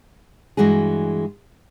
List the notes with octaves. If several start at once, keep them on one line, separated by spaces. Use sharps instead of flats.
G2 E3 G#3 F#4 G#4